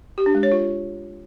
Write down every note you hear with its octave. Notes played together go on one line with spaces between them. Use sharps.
G4
D4
G#3
C#5
F4